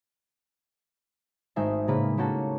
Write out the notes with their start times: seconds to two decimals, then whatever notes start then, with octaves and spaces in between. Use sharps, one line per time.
1.56 G#1 A3 D#4 E5 G#5 C7
1.88 A2 C#3 A#3 G#4 B4 B6
2.17 A3 A#3 C#4 F#4 A4